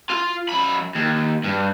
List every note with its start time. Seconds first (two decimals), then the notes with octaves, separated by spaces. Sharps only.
0.10 F4
0.49 F#2 B5
0.95 D#2
1.43 G2